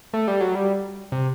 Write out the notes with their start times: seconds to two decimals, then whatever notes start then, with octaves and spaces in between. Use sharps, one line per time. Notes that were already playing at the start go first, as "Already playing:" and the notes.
0.13 A3
0.28 G3
0.41 F#3
0.55 G3
1.12 C3